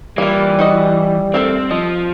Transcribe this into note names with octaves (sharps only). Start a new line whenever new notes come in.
E3 G3 A#3 F4
D#4 F#4 D#5
A3 C4 A4 A#4
F3 D#5